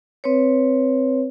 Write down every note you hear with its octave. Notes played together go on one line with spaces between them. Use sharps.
C4 B4 C#5